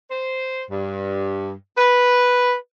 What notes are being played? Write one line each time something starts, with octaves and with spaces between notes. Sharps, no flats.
C5
G2
B4